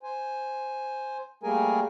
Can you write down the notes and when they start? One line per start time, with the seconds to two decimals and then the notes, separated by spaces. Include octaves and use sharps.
0.03 C5 G#5
1.43 G3 A3 A#3 G#4 A#4 G#5